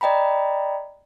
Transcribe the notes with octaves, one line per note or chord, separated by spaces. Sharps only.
D5 D#5 G5 A#5 B5